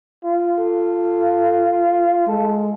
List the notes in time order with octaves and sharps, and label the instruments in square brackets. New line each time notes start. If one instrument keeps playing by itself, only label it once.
[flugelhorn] F4
[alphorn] A4
[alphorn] G#3 [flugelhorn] A4